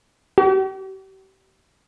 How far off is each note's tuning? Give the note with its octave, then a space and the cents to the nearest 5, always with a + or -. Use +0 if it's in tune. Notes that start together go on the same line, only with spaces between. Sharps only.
G4 -40